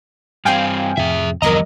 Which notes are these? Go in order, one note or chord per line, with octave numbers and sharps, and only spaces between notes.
G2 C4 F5 G5 G#5
F2 A2 C3 G#4 E5
G1 E2 C3 F3 G3 A#4 D#5 A#5